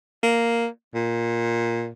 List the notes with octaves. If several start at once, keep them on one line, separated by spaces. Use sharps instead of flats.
A#3
A#2